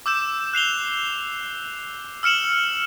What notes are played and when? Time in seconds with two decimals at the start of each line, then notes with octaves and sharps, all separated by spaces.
0.06 D6 E6 G6 E7
0.54 F#6 C7 F7 G7
2.23 E6 F6 C#7 E7 F#7